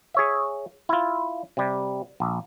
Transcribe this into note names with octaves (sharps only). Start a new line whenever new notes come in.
G#4 C#5 E5
E4 F4
C3 G3
A#1